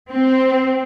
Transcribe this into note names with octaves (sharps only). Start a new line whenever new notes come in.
C4